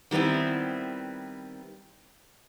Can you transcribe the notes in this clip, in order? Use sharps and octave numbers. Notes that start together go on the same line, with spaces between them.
D#3 G3 B3 C4 E4